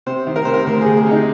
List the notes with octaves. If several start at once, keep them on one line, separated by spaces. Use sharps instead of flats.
C3 C5
D#3
A#4
C3 C5
A#4
D2 C5
G#4
D2
G#4
C3
D#4